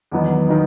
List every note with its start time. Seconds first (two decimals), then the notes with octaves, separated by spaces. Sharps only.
0.11 E2 D#3 F#3 B3 D#4
0.49 D#3 F#3 B3 D#4